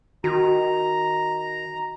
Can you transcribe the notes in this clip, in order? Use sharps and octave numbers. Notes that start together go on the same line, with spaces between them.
D#3 F#4 A#5